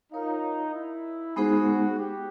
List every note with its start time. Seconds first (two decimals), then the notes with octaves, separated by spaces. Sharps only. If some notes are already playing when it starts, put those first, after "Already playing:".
0.12 D#4 F4 A#4 C#5 F5
0.74 E4
1.36 G#3 B3 D#4 F#4 G#4 C5
1.98 G4